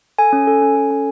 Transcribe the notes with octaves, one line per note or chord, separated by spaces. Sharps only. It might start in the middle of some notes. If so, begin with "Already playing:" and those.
A4 G#5
C#4
A4
C#4
A4
C#4